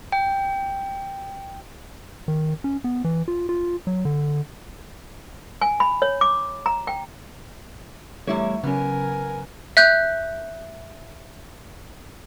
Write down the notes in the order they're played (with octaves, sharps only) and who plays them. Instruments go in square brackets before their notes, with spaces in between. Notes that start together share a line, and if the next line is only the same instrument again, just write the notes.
[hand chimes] G5
[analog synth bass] D#3
C#4
B3
E3
F4
F4
F#3
D3
[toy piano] G#5
B5
C#5
D6
A#5
G5
[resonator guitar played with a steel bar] E2 E4 C#5 [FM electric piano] G3 A3
[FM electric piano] C#3 F#3 C#4 [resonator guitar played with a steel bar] B3 [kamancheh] A#4 G#5
[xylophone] E5 F#6 G6